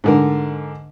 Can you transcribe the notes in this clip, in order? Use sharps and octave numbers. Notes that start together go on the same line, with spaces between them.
G#2 D3 A#4